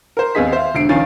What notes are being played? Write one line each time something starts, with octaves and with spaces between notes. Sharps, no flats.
A#4 C5
D#2 B3 C4 G#4 D#5 B6
C5 E5 F5
E1 D3 C7 D7
C#2 D#3 F3 C#4 G#5 A6